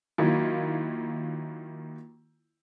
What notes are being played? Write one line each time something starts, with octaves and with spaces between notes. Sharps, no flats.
D#3 F#3 A#3 E4 F4